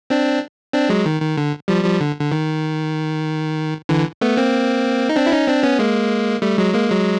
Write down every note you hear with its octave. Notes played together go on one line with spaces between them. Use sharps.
C4 D4
C4 D4
F#3 G#3
D#3
D#3
D3
F3 G3
F3 G3
D3
D3
D#3
D3 E3
A3 B3
A#3 C4
D#4
C4 D4
E4
C#4 D#4
C4 D4
B3 C#4
G#3 A#3
G3 A3
F#3 G#3
G#3 A#3
F#3 G#3